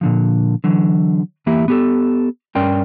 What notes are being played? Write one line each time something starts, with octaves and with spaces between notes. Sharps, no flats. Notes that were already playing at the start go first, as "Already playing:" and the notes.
A#2 D3 F3
D3 E3 F#3
E2 E3 A#3 E4 G4
B3 G4 A4
G2 C#4 A#4 D5 G5 C6